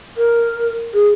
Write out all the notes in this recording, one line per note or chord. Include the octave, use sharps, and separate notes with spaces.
A#4
G#4